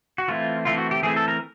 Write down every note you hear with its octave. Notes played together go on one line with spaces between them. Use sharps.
F#4
E3 A3 C4 E4 F4
E3 A3 C4 E4 F4
F#4
G4
E3 A3 C4 E4 G#4
A4
A#4